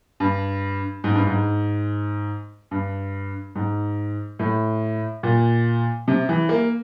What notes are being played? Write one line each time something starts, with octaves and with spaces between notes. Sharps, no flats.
G2
G#2
G2
G#2
G2
G#2
A2
A#2
C3
E3
A#3